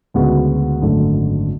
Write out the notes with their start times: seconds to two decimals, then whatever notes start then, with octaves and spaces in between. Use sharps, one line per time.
0.14 D2 C#3 G#3 B3 F#4
0.82 G#1 F#2 D3 A3